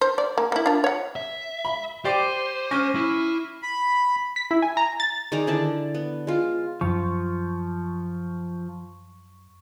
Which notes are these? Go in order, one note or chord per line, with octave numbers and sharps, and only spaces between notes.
C5
D5
A#3
A#3 E4
D4 F4
C#5 F#5
E5
B5
G4 C5 D5 D6 C7 D#7
C#4 C#6 F6 A#6
E4
B5
B6
E4
G#5
A#5
A6
D#3 G#4 D5 A#5
D3 E4 D5 A5
B3
G#3 F4
F#2 F3 C#6